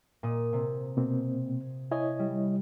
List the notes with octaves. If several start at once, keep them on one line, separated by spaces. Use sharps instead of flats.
A#2 D#6
C3
B2 A#3 C4
E4 C#5 D#5 G#5
G3